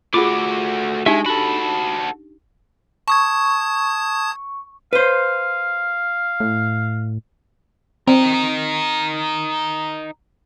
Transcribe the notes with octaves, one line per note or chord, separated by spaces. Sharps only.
A3 F4 F#4 G#4 D6
G#3 D4 D#4 G4 E5
F#4 A4 B5
A5 C#6 D#6 G#6
B4 C5 F5
A2
C4 D#4 A#4